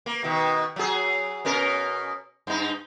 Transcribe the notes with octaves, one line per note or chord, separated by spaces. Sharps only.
A#3
B2 D#3
F#3 G#4
B2 C#4 A#4
G2 D#4